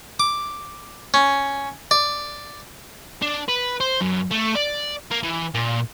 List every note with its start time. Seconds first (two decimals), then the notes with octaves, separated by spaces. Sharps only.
0.20 D6
1.14 C#4
1.91 D5
3.22 D4
3.48 B4
3.80 C5
4.01 F#2
4.31 A3
4.55 D5
5.11 A#3
5.23 E3
5.54 A#2